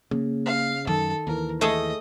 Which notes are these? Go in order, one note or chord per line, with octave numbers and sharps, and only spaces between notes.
C#3 A#3
F5
F#2 D#3 A4
D#2 E3 A#4
A3 G#4 A4 D#5